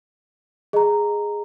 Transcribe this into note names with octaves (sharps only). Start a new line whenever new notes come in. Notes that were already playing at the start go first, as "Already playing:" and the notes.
G#4 D#5 A#5